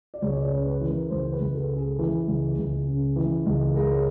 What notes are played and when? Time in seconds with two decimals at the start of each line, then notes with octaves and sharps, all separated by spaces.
0.14 D5
0.22 C#2 C#5
0.37 D5
0.43 C#5
0.51 C#3
0.66 B4
0.81 E3
0.88 A#4
1.10 C#2 C5
1.32 B4
1.40 C#2
1.55 A4
1.69 C#3
1.76 G#4
1.99 E3
2.27 C#2
2.57 C#2
2.87 C#3
3.16 E3
3.46 C#2
3.75 G#3 A#4
3.92 C#5